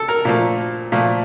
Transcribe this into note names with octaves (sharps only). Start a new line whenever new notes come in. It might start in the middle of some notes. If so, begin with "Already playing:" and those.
Already playing: A4
A#4
A#2 F3 A3 A#4
A#2 F3 A3